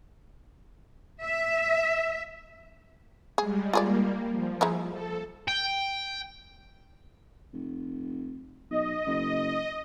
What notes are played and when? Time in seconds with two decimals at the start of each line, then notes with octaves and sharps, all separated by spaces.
1.23 E5
3.38 G3 G#3 G#4
3.73 G3 A#3 F4 G#4 D5
4.31 F3
4.61 G#3 D#4 E4
4.91 A4
5.48 G5
7.54 F1
8.71 B1 D#5
9.06 F#1